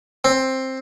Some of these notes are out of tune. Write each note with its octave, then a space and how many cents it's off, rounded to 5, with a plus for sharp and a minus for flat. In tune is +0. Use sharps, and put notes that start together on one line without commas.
C4 +10